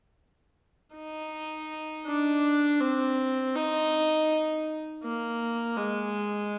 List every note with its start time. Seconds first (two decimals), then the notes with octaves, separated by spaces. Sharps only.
0.96 D#4
2.07 D4
2.81 C4
3.56 D#4
5.04 A#3
5.77 G#3